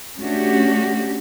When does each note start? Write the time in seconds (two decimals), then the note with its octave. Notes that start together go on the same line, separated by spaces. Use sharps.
0.21 A3 C#4 D4 F#4 G4